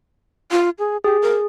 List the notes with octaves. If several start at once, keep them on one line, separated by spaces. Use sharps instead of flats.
F4
G#4
G4 G#4
A#4